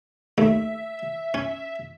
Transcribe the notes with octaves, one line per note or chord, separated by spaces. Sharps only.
D#2 A3 E5
C#4